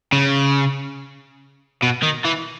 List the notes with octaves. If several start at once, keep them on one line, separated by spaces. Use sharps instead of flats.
C#3
B2
D#3
E3